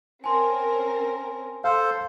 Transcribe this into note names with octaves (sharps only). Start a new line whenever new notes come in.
C4 C#4 A#4 G#5 A5 C6
A4 C5 F5